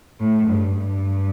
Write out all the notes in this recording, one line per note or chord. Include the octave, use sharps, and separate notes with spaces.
A2
G2
G2